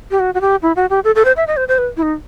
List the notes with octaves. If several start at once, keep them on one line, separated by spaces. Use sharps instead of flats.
G4
F#4
F#4
G4
E4
F#4
G4
A4
A4
C5
E5
D#5
C5
C5
B4
E4
D#4